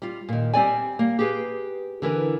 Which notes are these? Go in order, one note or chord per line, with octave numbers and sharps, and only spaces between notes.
G3 F4
A#2 D#3
G3 C4 D5 G#5
A#3
G4 G#4 B4
D3 E3 A#4 B4